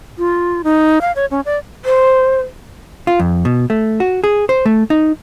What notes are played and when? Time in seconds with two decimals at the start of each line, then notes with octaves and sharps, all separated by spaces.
0.18 F4
0.64 D#4
1.01 F5
1.16 C#5
1.31 C#4
1.46 D5
1.85 C5
3.07 F4
3.19 F2
3.45 B2
3.70 A3
4.00 F#4
4.24 G#4
4.49 C5
4.66 A3
4.90 D#4